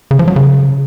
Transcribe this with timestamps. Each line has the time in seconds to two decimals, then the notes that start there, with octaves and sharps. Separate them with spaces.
0.11 C#3
0.19 F3
0.28 F#3
0.36 C#3